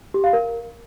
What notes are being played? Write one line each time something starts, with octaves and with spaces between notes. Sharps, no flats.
G4
F5
A#4